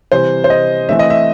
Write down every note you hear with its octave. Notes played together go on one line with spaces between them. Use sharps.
C3 E3 G3 C5
C5
D#5
E3 A3 C4 E5
D#5
E5